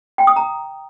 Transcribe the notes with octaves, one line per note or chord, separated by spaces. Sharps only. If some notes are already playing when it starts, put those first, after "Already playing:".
G5
D#6
A#5